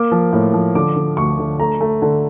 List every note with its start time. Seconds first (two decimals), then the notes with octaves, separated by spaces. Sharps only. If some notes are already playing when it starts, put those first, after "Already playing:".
Already playing: A#3 D6
0.12 F3
0.33 A2
0.54 F3
0.75 D3 D6
0.96 D3
1.17 D2 C#6
1.39 D3
1.59 A3 A#5
1.81 A3
2.02 D3